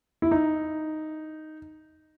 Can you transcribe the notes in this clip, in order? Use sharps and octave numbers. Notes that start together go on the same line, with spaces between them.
E4
D#4